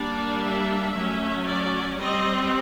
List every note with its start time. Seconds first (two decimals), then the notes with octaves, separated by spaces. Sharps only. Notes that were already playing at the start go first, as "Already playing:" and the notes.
Already playing: G3 A#3 D4 D5
0.42 E5
0.94 F#3 A3 C#4
1.45 D5
1.97 G3 C4 D#5